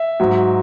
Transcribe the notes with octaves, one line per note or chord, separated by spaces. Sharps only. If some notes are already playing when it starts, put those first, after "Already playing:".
Already playing: E5
G#2 F#3